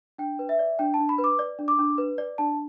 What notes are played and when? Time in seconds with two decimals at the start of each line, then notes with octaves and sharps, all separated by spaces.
0.18 D4 G5
0.39 B4
0.49 E5
0.59 D5
0.79 D4 G5
0.94 A5
0.99 D4
1.09 B5
1.18 B4
1.24 D6
1.39 D5
1.59 D4
1.68 D6
1.79 D4
1.98 B4
2.18 D5
2.38 D4 A5